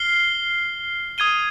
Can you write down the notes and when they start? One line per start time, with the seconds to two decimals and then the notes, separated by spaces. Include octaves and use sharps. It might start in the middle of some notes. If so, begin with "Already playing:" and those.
Already playing: F6 C7 G7
1.18 D#6 G#6 D#7 G7